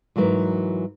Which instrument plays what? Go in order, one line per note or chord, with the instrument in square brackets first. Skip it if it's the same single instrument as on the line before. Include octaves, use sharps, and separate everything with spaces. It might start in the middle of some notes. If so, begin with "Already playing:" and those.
[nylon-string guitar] G#2 E3 F#3 A#4 B4